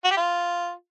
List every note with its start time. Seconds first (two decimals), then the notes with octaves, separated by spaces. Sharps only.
0.05 F#4
0.11 G4
0.17 F4